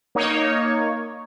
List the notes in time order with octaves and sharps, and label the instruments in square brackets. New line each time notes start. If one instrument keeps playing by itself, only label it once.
[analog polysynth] A#3 D#4 C#5